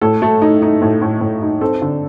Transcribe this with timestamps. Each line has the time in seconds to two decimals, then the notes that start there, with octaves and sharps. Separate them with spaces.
0.01 A2 A4
0.22 A3
0.42 D#4
0.62 D#4
0.82 A2
1.02 A2
1.21 A2
1.42 D#4
1.61 C4 A4
1.82 D3